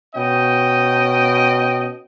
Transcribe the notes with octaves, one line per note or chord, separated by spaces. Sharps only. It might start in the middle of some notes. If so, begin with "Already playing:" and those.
B2 C#4 D#5 G5